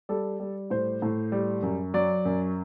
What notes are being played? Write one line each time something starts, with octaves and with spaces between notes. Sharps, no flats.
G3 A4
G3
A2 C5
A2
G3
F#2
F#3 D5
F#2